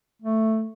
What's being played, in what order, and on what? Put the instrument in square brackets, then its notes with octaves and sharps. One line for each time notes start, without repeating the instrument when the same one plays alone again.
[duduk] A3